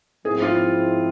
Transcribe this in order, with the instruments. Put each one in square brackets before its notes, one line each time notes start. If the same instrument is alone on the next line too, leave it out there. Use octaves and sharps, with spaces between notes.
[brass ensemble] G#2 F3 C4 E4 [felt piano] G#4
[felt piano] F4